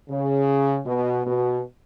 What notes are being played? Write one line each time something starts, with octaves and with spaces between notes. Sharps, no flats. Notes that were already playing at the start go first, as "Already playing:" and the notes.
C#3
B2
B2